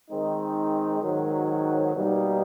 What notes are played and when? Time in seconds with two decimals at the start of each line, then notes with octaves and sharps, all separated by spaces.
0.11 D#3 G#3 C4 D#4
1.03 G#2 D#3 F#3
1.93 B2 G3 A#3 D#4